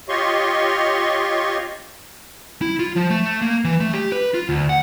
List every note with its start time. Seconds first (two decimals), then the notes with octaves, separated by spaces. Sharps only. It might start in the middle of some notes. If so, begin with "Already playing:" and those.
0.09 F4 G4 C#5 D#5 C6 C#6
2.61 E4
2.79 F4
2.96 F3
3.10 A3
3.42 A#3
3.64 E3
3.80 A3
3.94 G4
4.12 B4
4.34 F4
4.49 D2
4.69 F#5